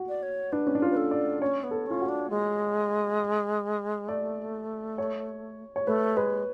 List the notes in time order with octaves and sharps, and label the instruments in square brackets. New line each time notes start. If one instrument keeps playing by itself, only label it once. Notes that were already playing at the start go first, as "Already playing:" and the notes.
Already playing: [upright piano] F#4
[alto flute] D5
C#5
[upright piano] D4 [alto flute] B4
[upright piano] C#4
D4
F4
[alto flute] B4
A4
[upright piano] D5
[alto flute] C#4 [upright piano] C#5
[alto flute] B3
[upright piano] A4
[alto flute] C#4 [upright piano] F4
[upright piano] F#4
[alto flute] D4
G#3
[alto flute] A3 [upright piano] D5
[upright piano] C#5
C#5
[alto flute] A3 [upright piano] B4
[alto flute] G#3 [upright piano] B4